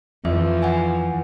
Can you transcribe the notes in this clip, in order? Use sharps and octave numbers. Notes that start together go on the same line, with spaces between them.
F2 E3 F3 E5
F#5 G#5